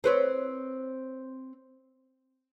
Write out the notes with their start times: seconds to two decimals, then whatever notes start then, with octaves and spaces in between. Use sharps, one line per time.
0.04 C4 B4 C#5